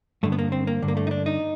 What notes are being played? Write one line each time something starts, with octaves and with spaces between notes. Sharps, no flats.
G2 D3 A3
B3
A#3
C4
A#3
G2 D3
A#3
A3
D#4
D4
D#4